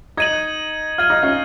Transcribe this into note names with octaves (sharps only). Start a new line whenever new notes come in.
D#4 G#6 D#7 F#7
F4 F6 G#6 D#7 F#7
D#4
C#4 F4